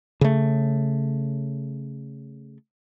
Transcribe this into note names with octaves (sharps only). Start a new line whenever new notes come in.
C#3 A3